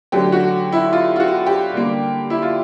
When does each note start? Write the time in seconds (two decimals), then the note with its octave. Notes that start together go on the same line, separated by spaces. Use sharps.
0.12 D3 F#3 A3 G4
0.32 F#4
0.72 E4
0.93 F4
1.16 F4
1.20 F#4
1.46 G4
1.73 D3 G3 A#3
2.30 E4
2.42 F4